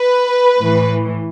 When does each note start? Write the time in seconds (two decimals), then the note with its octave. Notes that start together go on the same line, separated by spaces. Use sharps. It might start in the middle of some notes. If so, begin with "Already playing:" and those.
Already playing: B4
0.60 A2 E3